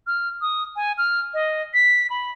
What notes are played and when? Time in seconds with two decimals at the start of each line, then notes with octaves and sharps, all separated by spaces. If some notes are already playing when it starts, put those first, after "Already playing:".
0.07 F6
0.41 D#6
0.76 G#5
0.98 F6
1.34 D#5
1.74 B6
2.10 B5